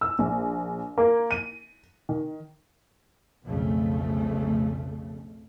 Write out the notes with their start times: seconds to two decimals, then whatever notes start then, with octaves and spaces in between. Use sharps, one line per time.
0.01 E6
0.19 A#1
0.98 A#3
1.31 D#7
2.09 D#3
3.44 B1 F2 C#3 A3